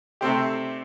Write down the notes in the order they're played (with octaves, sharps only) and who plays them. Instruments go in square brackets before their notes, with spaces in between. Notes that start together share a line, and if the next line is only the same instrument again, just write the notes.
[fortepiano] C3 A3 C4 G4